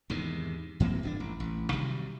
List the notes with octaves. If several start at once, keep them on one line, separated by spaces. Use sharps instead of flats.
E2 G#2 C3 D#3
G2 E3 A#3 C4
D1 G1 C#4 D4
A1
A1
C3 D#3 F#3 G3